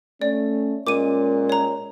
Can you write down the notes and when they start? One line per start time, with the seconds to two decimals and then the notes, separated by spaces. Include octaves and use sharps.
0.22 A3 C#4 D5
0.87 A#2 G#3 C#4 D6 D#7
1.50 C#5 A#5